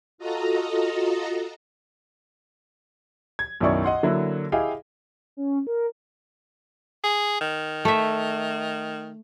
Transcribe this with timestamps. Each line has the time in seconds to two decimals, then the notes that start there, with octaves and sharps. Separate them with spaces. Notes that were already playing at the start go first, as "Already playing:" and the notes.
0.18 F4 F#4 A4 D#5 A#5
3.39 G#6
3.60 B1 F#2 D#3 E4 D5 C#6
3.84 D#5 F#5 C6
4.03 D3 F#3 A#3 E4
4.52 E4 G4 G#4 D#5 F5 G5
5.37 C#4
5.67 A#4
7.04 G#4
7.41 D#3
7.85 A3 E5